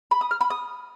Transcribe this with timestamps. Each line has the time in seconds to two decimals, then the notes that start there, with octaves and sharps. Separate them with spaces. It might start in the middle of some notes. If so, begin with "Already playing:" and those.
0.11 B5
0.21 D#6
0.31 F6
0.41 B5
0.50 D#6